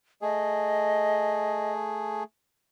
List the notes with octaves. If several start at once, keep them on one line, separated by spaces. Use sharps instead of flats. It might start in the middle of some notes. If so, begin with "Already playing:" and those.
A3 G#4 D#5